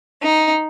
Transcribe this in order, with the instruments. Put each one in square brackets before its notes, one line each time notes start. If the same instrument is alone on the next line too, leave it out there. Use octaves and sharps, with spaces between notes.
[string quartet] D#4